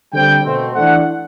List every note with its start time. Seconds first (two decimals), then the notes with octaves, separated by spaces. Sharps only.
0.13 D3 G3 C4 G5
0.44 B2 A3 C4
0.74 E3 A3 D4 F#5